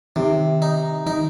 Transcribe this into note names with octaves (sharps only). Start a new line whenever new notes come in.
C3 D#3
D#4
D#3 D#4